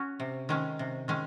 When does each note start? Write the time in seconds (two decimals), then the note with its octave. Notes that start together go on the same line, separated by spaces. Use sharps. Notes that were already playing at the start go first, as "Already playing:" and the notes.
Already playing: C#4 F#4
0.20 C3
0.49 D#3 G#3 C#4
0.79 C3
1.08 D#3 G#3 C#4